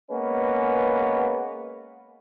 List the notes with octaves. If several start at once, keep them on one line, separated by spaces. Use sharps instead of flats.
G#3 A#3 B3 C#4 B4